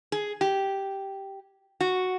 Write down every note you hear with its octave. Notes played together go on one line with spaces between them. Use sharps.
G#4
G4
F#4